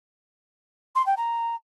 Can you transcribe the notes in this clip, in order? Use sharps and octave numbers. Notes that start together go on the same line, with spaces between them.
C6
G5
A#5